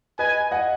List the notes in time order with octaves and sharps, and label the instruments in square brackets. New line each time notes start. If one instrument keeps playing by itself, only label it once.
[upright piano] B4 D#5 [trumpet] G#5
[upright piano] D#5 F#5